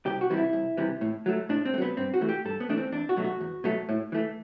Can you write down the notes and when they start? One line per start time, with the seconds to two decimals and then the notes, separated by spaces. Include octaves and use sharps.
0.06 C2 G4
0.21 F#4
0.30 C3 E3 G3
0.37 E4
0.53 C2
0.77 C3 E3 G3
1.01 A2
1.26 F#3 A3
1.49 A2 D4
1.65 C4
1.74 A3
1.78 F#3 B3
1.97 G2 C4
2.14 F#4
2.21 E3 A3
2.29 G4
2.45 G2 A4
2.60 B3
2.69 E3 A3 D4
2.77 C4
2.92 E2 D4
3.09 F#4
3.16 B2 F#3 A3
3.24 F#4
3.40 E2
3.64 B2 F#3 A3
3.89 A2
4.12 E3 A3